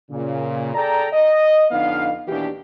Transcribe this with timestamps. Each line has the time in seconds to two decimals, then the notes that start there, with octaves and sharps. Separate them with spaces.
0.11 A#2 C#3
0.74 G#4 A4 D5 G5 A5 A#5
1.12 D#5
1.71 F2 D3 B3 D4 D#4 F5
2.28 D#2 B2 E3 D4 G4